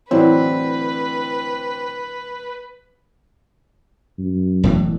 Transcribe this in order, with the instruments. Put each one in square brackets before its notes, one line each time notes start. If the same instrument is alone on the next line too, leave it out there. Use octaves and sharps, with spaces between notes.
[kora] A2 D3 F#3 [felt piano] E3 C4 [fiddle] B4
[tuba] F#2
[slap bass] E1 A2 E3